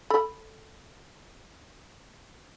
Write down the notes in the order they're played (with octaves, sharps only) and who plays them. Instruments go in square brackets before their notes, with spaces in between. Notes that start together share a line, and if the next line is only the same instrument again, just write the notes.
[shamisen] A4 B5